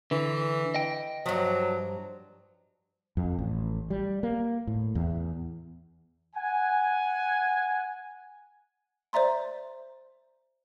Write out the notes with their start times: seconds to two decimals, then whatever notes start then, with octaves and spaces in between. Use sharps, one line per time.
0.11 D3 E3
0.74 D#5 G5
1.26 G2 F3 F#3
3.17 F2
3.39 A1
3.90 G3
4.23 A#3
4.67 A2
4.95 E2
6.36 F#5 G#5
9.13 C5 D5 E5 A#5 C6